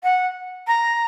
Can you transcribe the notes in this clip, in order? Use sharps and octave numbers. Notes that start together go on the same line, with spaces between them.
F#5
A#5